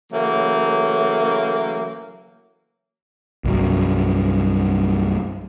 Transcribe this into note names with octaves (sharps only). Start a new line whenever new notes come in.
C#3 E3 F#3 A3 A#3
C2 G2 F#3